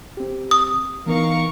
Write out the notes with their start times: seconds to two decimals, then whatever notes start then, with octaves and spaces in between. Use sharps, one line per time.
0.17 C4 G4
0.51 D#6
1.06 E3 B3 D#4 A#4 F5 C#6